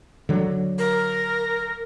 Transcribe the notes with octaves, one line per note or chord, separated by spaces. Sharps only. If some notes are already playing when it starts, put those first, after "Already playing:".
D3 F#3
A#4